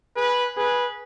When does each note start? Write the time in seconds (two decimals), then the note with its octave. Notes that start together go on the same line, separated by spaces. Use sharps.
0.16 G#4 B4
0.57 G#4 B4